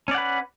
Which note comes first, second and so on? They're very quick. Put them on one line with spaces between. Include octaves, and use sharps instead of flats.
C#4 D5 F#5 B4